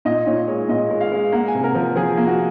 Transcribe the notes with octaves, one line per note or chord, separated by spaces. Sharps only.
A#2 D#5
A#2 C#5
G#3 C#5
A#2 D#5
G#3
F5
G#3
A#3 F#5
G#5
C3
A#4
F3
F3 G#4
A#3
F#4